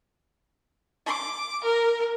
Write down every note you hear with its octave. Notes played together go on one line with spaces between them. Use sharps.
D6
A#4